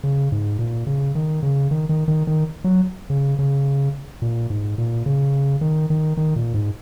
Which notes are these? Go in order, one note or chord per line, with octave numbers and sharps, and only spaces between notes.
C#3
G#2
A#2
C#3
D#3
C#3
D#3
D#3
D#3
D#3
F#3
C#3
C#3
A#2
G#2
A#2
C#3
D#3
D#3
D#3
A#2
G#2